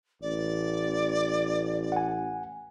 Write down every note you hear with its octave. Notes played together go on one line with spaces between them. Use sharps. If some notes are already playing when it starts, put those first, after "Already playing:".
A1 D5
F#5 G#5